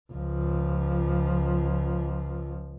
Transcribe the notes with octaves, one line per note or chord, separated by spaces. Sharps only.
C#2 F3